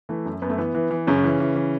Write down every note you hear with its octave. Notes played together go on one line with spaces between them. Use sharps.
E3 A3
F#2
F#2 B3
A3
E3 B3
E3
E3
F#2 C#3 C#4
E3
E3
E3